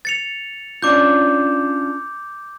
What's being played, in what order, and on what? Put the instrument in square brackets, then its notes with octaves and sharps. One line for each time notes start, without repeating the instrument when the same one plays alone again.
[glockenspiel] A6 C#7 F7
[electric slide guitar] C#4 D4 F4 [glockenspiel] D6 G6